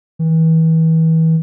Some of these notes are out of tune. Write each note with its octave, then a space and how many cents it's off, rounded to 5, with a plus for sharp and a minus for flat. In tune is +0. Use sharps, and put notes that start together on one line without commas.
E3 -35